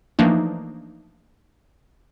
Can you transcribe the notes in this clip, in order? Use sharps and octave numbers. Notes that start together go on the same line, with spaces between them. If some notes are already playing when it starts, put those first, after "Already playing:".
E3 F3 A3 A#3 D4 D#4